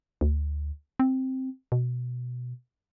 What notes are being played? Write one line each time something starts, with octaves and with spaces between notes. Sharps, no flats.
D2
C4
B2